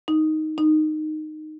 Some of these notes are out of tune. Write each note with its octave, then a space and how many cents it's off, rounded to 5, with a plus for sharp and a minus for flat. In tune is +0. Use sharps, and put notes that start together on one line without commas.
D#4 +5
D#4 -10